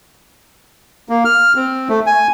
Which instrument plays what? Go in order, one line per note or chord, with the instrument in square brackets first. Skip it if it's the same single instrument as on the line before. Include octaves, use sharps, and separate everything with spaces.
[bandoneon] A#3
F6
C4
A3
G#5